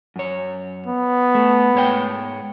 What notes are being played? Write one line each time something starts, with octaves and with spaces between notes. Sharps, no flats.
F#2 C#5
B3
A3
G#2 C#5 G5